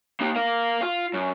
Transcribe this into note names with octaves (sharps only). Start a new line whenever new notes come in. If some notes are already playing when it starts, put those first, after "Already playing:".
A#3 D#4
A#4 F5
F4
F#2